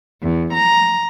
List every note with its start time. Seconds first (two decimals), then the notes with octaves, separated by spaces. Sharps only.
0.21 E2
0.53 A#5